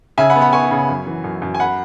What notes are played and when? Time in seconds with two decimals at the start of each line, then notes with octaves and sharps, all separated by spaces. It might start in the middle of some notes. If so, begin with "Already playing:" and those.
0.18 C#3 E5 G#5
0.30 F#5 B5
0.36 B3
0.41 F#5 B5
0.53 B3 G#5 C#6
0.71 C#3
0.89 F#2
1.07 E3
1.24 F#2
1.42 F#2
1.54 G#5
1.60 F#5 B5